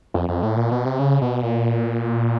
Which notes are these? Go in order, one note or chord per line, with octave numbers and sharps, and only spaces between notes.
F2
F2
A2
A#2
B2
C3
C#3
B2
A#2